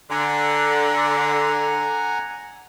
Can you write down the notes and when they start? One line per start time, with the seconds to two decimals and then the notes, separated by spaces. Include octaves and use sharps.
0.11 D3 F#5 G#5 A#5